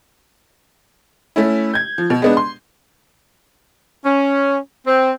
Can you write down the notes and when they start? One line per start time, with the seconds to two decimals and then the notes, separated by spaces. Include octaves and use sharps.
1.36 A3 C#4 E4
1.74 G6 G#6
1.98 F3
2.10 B2
2.22 G#3 B3 D4
2.37 C6
4.05 C#4
4.87 C4